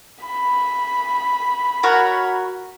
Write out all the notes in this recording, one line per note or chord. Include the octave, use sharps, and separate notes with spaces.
B5
F#4 A#4 C#5